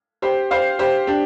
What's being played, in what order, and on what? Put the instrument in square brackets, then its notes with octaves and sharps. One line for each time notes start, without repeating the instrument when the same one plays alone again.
[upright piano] G4 C5
C5 F5
G4 C5
D4 G4